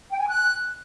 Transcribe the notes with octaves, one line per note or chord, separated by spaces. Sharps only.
G5
G#5
F#6